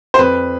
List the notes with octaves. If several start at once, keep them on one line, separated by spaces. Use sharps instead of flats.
C5
F2 B4